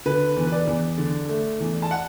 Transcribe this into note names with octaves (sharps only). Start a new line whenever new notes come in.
D3 B4
E2
B4
D5
E2
D3
A3
E2
A5
F#5